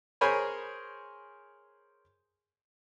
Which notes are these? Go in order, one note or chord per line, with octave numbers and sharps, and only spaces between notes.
G#4 A#4 C5 C#5 G#5 B5